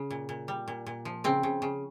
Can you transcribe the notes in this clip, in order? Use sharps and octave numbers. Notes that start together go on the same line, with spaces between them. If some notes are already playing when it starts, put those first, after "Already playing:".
Already playing: C#3
A#2
A#2
G3
A#2
A#2
F3
C#3 C4
C#3
C#3